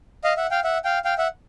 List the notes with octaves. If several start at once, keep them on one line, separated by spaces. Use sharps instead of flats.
D#5 F5
E5 F#5
F5 G5
E5 F#5
F5 G5
F5 G5
E5 F#5